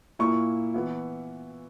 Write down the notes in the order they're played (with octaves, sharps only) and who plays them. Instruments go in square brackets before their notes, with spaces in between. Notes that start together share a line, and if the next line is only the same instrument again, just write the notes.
[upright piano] A#2 A#3 E4 C#6
E3 B3 E4